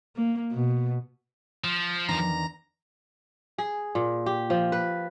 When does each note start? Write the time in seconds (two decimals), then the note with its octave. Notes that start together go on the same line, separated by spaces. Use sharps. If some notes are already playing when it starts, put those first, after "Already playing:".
0.16 A#3
0.52 B2
1.64 F3
2.09 E2 D#3 D4 A#5
3.58 G#4
3.95 A#2
4.26 G4
4.50 F3
4.72 B4